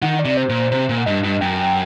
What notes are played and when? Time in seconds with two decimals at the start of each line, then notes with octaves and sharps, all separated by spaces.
0.02 D#3 F#5
0.19 D5
0.25 C3
0.37 C5
0.49 A#2
0.55 C5
0.71 C3 C5
0.89 A#2
0.98 F#5
1.06 G2 D#5
1.24 G2
1.41 F#2 G5